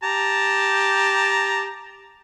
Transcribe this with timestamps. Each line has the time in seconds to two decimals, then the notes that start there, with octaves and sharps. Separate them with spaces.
0.03 G4 A5 A#5